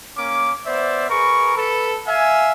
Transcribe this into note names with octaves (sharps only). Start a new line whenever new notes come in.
A#3 C#4 D6
B3 C5 D5 E5
G#4 A#4 B4 C#6
A4 B4
E5 F5 G#5